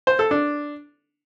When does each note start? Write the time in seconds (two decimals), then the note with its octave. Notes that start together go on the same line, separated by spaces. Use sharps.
0.07 C5
0.19 A4
0.31 D4